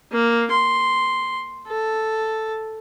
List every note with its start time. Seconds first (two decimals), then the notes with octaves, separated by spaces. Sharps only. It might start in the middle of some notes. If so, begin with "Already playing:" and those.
0.12 A#3
0.51 C6
1.68 A4